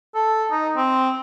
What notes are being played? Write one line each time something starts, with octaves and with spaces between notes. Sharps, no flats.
A4
D#4
C4